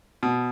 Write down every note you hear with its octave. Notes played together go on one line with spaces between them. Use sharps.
B2